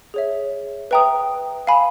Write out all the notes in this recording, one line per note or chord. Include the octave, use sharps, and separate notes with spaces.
G#4 C#5 E5
B4 E5 G5 A#5 D#6
F5 G#5 B5